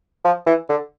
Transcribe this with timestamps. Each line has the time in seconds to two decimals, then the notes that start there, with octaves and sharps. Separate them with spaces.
0.24 F3
0.46 E3
0.69 D3